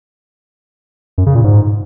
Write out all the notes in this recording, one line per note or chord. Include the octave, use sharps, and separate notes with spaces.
F#2
C#3
A#2
G#2